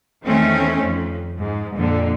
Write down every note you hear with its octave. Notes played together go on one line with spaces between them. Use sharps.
E2 D#3 A3 C4 C#4
F2
G#2
F2 A#2 D3